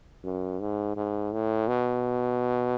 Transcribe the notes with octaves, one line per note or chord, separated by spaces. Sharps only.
F#2
G#2
G#2
A2
B2